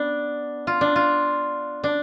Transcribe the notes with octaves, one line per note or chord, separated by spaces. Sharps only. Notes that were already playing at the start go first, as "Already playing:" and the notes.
Already playing: B3 D4
F4
D4
F4
D4